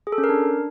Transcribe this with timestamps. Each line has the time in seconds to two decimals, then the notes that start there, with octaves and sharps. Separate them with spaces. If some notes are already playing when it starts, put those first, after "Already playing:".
0.07 G#4
0.12 A4
0.18 C#4
0.24 A#4
0.29 D4